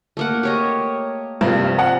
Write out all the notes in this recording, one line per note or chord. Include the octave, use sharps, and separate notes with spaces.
A3 A#3 F#5
G4 C#5 D#5
G2 C3 F3 A#3
F#5